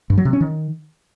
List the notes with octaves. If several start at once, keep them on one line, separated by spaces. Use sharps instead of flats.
G2
F#3
C3
C#4
D#3